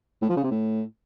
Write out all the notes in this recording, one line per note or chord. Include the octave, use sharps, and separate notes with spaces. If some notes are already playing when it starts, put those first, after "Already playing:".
A2
F3
C#3
C3
A2